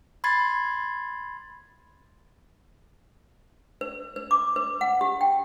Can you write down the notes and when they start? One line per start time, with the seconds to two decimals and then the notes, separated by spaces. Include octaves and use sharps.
0.24 B5 C6 G#6 A6 C7
3.81 B4
4.16 B4
4.31 D6
4.56 B4
4.81 F#5
5.01 G4
5.21 G5